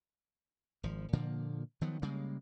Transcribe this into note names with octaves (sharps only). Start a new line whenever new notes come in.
G#1 F3
A#2 D3 F3 A#3
D#3 F3 F#3 B3
C#3 G3 G#3 A#3